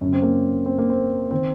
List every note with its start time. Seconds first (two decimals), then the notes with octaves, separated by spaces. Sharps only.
0.01 F#2 C#3 C#4
0.13 C4
0.22 A#3
0.66 C4
0.78 A#3
0.90 C4
1.31 D#3 C4